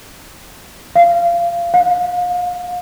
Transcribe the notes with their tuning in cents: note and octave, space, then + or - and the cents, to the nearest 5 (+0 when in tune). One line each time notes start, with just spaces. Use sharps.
F5 -20
F5 +35